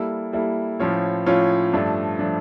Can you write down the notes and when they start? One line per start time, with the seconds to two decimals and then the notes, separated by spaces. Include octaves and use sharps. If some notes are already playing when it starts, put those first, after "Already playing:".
Already playing: G3 A#3 E4 A4
0.33 G3 A#3 E4 A4
0.80 A2 F3 C#4 F4 C#5
1.26 A2 F3 C#4 F4 C#5
1.73 G2 F3 A3 D4
2.19 F3 A3 D4